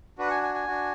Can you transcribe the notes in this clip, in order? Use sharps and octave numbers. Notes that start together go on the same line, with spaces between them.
D4 F#4 B4
F#5
G#5
G#5
G#5
D4 F#4